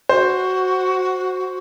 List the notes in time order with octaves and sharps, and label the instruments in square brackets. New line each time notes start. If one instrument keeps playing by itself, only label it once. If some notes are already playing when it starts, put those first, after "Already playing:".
[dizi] F#4 [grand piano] C5